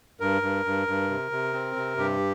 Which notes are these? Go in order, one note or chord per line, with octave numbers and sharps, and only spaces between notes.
G2 A#4
G2
G2
G2
C3
C3
C4
C3
G2 G4